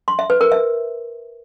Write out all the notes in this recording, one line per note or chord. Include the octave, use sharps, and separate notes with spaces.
C6
E5
B4
A#4
E5